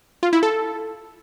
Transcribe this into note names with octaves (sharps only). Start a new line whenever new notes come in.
F4
E4
A4